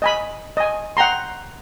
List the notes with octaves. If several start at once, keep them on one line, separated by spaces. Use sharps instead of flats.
D#5 G#5 B5
D#5 G#5
F#5 G5 A#5 C6